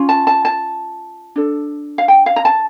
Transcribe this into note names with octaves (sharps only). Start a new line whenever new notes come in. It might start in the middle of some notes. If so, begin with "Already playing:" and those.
Already playing: C#4 F4
A5
A5
A5
D4 A4
F5
G5
F5
A#5
A5